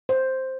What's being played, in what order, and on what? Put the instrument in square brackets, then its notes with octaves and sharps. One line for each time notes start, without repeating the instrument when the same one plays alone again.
[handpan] C5